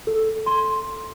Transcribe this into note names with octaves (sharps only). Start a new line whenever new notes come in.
A4
C6